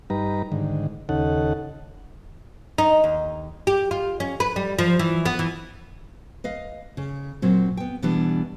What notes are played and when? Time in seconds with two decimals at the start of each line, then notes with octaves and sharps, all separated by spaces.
0.10 G2 G3 D#4 B4 A#5
0.52 G#2 D3 D#3
1.09 D#2 C#3 D#4 A4 F#5
2.78 D#4
3.04 D#2
3.67 G4
3.91 F4
4.20 C#4
4.40 B4
4.56 G3
4.79 F3
4.99 E3
5.26 B3
5.39 E3
6.44 B4 D#5 F5
6.97 C#3
7.42 A#2 F#3 C4
7.77 B3 G5
8.02 B2 E3 G3 B3 D4